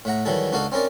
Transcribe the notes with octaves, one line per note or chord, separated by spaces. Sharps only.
A2 E5 F#5 A#5
D#3 E3 F#3 G3 E4 A4
C#2 D4 D#4 F#4 A4 F5
C4 C#4 D#4 A#4 D5